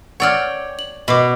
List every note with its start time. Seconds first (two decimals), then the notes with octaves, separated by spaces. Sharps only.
0.20 C#5 D5 F#5 G5 E6 F6
0.79 F#7
1.08 B2 B5 D6